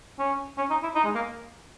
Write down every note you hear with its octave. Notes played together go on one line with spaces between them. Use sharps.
C#4
C#4
D#4
E4
D#4
G#3
A#3